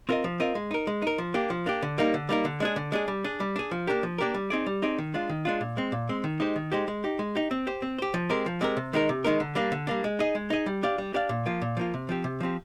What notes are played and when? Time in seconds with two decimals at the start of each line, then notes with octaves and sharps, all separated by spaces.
0.09 C4 F4 A#4 D#5
0.24 F3
0.40 C4 F4 A#4 D#5
0.55 G#3
0.71 D#4 A#4
0.87 G#3
1.02 D#4 A#4
1.18 F3
1.34 A#3 D4 G4
1.50 F3
1.66 A#3 D4 G4
1.82 D3
1.98 G3 A#3 D#4 A#4
2.14 D3
2.29 G3 A#3 D#4 A#4
2.45 D3
2.60 G#3 D4 G#4
2.76 D3
2.92 G#3 D4 G#4
3.08 G3
3.24 D4 G#4
3.40 G3
3.56 D4 G#4
3.71 F3
3.87 A#3 D4 G4 A#4
4.03 F3
4.18 A#3 D4 G4 A#4
4.34 G3
4.50 C4 D#4 G#4 D5
4.66 G3
4.82 C4 D#4 G#4 D5
4.98 D#3
5.14 G#3 D4 F4
5.29 D#3
5.45 G#3 D4 F4
5.61 A#2
5.77 G#3 C4
5.92 A#2
6.09 G#3 C4
6.24 D#3
6.40 G#3 D#4 G4 C5
6.56 D#3
6.72 G#3 D#4 G4 C5
6.88 G#3
7.04 D#4 G4
7.19 G#3
7.35 D#4 G4
7.51 C4
7.67 G4 C5
7.82 C4
7.98 G4 C5
8.14 F3
8.30 G#3 C4 G4 A#4
8.46 F3
8.61 G#3 C4 G4 A#4
8.77 C3
8.93 D#3 G#3 D#4 A#4
9.09 C3
9.24 D#3 G#3 D#4 A#4
9.40 D3
9.55 G3 A#3 D4
9.72 D3
9.87 G3 A#3 D4
10.04 G#3
10.19 D#4 G#4 D#5
10.35 G#3
10.50 D#4 G#4 D#5
10.66 G3
10.83 D4 G4 D5 F5
10.98 G3
11.14 D4 G4 D5 F5
11.29 A#2
11.46 F3 A#3 F4
11.62 A#2
11.77 F3 A#3 F4
11.94 C3
12.09 F3 C4 G4
12.24 C3
12.40 F3 C4 G4